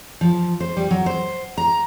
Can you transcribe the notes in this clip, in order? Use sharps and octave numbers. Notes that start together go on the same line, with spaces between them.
F3
C5
G3
F#3
C5
A#5